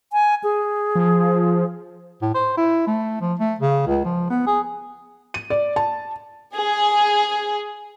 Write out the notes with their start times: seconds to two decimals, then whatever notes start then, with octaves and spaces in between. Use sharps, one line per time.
0.13 G#5
0.44 G#4
0.95 F3
2.22 A2
2.34 C5
2.57 E4
2.87 A3
3.21 F3
3.40 A3
3.60 C#3
3.87 C#2
4.05 F3
4.30 B3
4.47 G#4
5.34 D#7
5.50 D5
5.76 A5
6.55 G#4